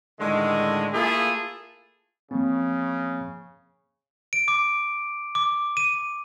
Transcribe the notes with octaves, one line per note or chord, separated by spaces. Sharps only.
A2 D3 D#3 G#3
A3 A#3 E4 F4 G#4 A4
C#3 F3 A#3 C4
D7
D6
D6
D#7